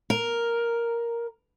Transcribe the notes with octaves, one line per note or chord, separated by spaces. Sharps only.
A#4